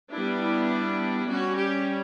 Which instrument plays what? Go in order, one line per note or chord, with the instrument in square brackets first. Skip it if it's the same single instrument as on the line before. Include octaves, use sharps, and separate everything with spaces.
[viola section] G3 B3 D4 E4
E4
G3 C#4 F#4
G4